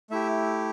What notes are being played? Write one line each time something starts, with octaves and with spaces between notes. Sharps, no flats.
A3 E4 G4 E5